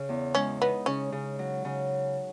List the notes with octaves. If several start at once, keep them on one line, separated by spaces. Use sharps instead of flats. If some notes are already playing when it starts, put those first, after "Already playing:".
Already playing: C#3
E2
G#3 C#4
B3 D#4
C#3 C#4
C#3
F#3
C#3